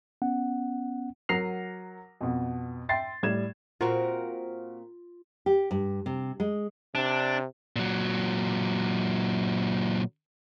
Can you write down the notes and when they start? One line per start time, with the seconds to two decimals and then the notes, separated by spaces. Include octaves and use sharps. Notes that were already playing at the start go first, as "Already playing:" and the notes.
0.22 B3 C#4 F#5
1.29 F#3 A#4 F#5 A#6 C7 F7
2.21 F2 B2
2.89 E5 G5 C6 A6 C7
3.23 A2 G3 G#6 E7
3.81 A#2 C4 F4 F#4 A#4
5.46 G4
5.71 G2
6.06 C3
6.40 G#3
6.95 C3 D4
7.76 A#2 F#3